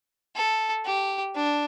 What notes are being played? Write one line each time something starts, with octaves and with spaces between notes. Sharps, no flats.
A4
G4
D4